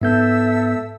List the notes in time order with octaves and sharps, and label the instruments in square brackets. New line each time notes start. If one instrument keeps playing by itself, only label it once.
[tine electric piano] G#2 B3 G6 [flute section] A4 E5 E6